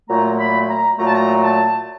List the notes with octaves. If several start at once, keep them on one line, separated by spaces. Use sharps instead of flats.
A#2 F#3 A3 A#5
B5
A#5
A#2 F#3 A3 A#5
A5
A#5
A5